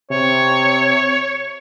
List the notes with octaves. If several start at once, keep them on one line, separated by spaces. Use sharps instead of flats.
C3 C#5